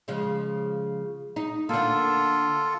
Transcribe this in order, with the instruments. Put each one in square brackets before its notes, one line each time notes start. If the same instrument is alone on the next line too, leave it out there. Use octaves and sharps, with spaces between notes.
[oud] C#3 F3 G#3
D#4
[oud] D3 A#3 [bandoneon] F4 A4